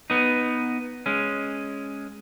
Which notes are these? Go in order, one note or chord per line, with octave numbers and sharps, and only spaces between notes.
B3 D#4
G#3 C#4